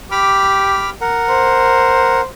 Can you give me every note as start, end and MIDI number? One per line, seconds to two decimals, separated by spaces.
0.11 0.93 67
0.11 0.90 83
0.11 0.90 86
0.11 0.90 89
1.01 2.21 70
1.01 2.21 78
1.29 2.27 72